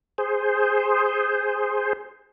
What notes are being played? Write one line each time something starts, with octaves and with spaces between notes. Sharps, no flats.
G#4 C5